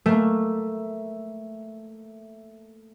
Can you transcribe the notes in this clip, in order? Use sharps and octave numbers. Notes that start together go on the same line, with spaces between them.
A3 A#3